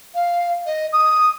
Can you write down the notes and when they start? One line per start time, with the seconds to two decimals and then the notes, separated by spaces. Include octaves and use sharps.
0.14 F5
0.66 D#5
0.92 D#6